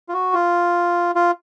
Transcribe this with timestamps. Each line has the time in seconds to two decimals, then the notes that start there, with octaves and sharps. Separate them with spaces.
0.09 F4
0.13 F#4
0.34 F4
1.15 F4